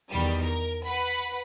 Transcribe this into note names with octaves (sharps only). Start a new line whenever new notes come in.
E2 D#3 G3
A#4
B4 F#5 B5